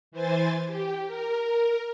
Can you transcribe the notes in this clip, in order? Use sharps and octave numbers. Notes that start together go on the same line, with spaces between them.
E3 C5 G#5 A6
G4
A#4